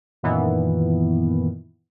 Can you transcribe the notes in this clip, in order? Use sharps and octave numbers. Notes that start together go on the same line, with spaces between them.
F#2 A#2 D#3 E3 B3